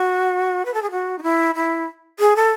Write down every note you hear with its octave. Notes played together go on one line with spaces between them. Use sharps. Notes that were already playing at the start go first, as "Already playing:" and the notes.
Already playing: F#4
B4
A4
G#4
F#4
D#4
E4
E4
G#4
A4